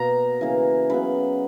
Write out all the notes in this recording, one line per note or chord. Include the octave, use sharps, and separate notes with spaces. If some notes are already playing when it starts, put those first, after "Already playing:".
Already playing: B2 A#3 A#5
C#3 E3 A#3
C#3 F#3 B3 B5